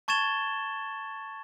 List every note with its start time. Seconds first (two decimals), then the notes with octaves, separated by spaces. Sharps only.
0.08 A5 C#6 G#6 A6 E7 G7